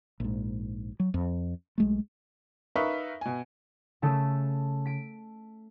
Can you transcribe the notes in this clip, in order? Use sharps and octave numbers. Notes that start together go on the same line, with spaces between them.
A#1 G#2
F#3
F2
B1 G#3 A3
D#4 A#4 B4 E5 F5 C#6
B2 G#5
C#3 A3 A4
B6 D7